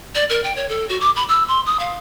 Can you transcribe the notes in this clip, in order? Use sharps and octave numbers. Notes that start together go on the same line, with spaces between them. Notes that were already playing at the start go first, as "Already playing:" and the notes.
D5
A#4
G5
C#5
A4
F#4
D6
B5
E6
C6
D#6
F5